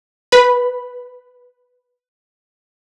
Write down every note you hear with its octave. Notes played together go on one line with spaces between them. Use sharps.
B4 B5